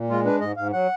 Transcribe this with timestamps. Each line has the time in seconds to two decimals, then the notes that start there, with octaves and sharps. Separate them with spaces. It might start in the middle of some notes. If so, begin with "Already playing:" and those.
Already playing: A#2
0.10 G#3 F4
0.25 D4 B4
0.41 G#2 D#5
0.56 G#2 F5
0.73 F#3 F#5